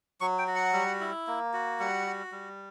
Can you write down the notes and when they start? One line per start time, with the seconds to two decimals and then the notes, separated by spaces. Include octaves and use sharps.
0.21 F#3 C#6
0.39 G5
0.47 F#4
0.55 F#5
0.73 G3
1.01 E4
1.27 A#3
1.53 F#4
1.80 G3 F#5
2.06 F#4
2.32 G3